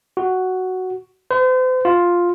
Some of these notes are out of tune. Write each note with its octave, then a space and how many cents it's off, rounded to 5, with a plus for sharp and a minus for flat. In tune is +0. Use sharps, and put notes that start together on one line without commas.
F#4 +5
C5 -40
F4 +5